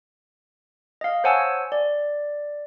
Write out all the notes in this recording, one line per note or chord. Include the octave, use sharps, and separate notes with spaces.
D#5 F5
C5 C#5 F#5 G#5 A5 E6
D5